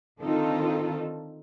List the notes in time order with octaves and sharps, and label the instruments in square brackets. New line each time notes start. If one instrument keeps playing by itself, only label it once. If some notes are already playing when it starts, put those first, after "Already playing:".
[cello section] D3 D#3 C4 D#4 F4 A4